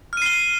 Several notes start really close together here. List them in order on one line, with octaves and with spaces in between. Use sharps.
F6 D#7 C7 G7